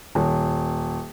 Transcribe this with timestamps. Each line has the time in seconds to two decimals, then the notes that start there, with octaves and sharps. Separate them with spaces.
0.15 D#1